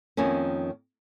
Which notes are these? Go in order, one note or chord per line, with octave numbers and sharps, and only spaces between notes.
F2 D#3 A#3 C#4